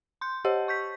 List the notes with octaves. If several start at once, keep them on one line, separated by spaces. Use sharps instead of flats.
C6 G6
G4 C5 D#5 F#5 A5
C#6 G6 B6